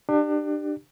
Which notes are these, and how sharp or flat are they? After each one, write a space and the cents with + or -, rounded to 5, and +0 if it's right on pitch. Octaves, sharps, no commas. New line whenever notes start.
D4 +30 G4 +0